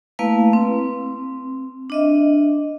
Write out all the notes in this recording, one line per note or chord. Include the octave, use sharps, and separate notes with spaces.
A3 A#3 E4 B4 F5
C4
D4 D#5 E5